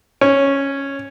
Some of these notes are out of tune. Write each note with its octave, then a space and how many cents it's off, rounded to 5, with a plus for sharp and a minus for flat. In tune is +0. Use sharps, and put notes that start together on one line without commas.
C#4 -5